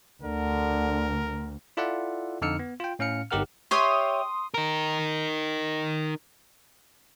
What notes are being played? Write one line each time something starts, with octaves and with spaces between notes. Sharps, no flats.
D2 D3 A#4
E4 F4 A4 D5 E5 F#5
F2 D3 D#4 E6 F6 C#7
B3
F4 G5
A2 C#4 F5 F6 C#7
G1 D#4 G4 A#4 F#5 F6
G4 C#5 E5 C6 D#6
D#4 A#4